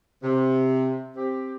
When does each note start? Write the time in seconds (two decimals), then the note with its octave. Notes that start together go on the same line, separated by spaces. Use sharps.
0.22 C3
1.16 C4 G4